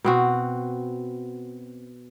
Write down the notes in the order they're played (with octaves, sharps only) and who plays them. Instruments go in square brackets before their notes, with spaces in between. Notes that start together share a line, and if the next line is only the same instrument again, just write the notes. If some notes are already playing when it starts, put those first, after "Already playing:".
[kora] B2 C4 F#4